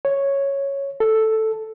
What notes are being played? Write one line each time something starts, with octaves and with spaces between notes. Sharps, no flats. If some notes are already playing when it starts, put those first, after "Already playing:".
C#5
A4